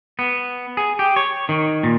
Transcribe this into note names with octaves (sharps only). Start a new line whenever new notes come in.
B3
G#4
G4
C#5
D#3
A#2